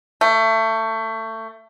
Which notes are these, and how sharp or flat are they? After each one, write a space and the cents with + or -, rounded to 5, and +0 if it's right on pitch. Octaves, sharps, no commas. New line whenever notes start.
A3 +25